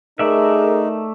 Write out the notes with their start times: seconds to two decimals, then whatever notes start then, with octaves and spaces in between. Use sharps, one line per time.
0.19 A3 D#4 G#4 A#4 D5 E5